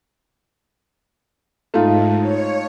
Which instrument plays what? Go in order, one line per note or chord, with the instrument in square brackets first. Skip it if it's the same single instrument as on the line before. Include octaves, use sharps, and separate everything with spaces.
[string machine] G#2 [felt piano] A3 D#4 F4
[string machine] C#5